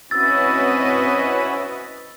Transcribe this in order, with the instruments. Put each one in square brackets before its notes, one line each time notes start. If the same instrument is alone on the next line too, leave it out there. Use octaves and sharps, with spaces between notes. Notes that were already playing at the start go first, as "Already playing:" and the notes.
[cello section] C4 B4 D#5 [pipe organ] C#4 E4 F#4 [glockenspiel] E6 A6